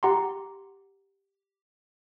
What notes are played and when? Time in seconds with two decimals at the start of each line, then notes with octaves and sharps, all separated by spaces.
0.03 G4 F#5 A#5 C6